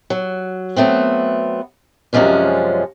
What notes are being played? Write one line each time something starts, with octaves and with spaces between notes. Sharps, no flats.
F#3
F#3 A3 B3 C4
F#2 C3 F3 G#3 C#4 D4